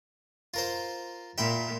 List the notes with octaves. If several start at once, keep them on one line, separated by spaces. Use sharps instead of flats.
F4 A#4 C5
A#2 E5 G5 B5